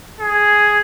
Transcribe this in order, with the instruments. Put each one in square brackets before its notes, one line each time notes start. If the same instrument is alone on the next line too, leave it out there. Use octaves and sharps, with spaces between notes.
[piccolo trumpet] G#4